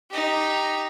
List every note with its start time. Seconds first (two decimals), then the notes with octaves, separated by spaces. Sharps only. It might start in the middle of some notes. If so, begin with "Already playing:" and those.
0.11 D#4 G4